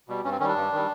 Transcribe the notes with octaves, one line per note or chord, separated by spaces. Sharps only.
B2 G3
G2 C#4
C4
D#3 G3 C#4 D4
G2
D#3 G3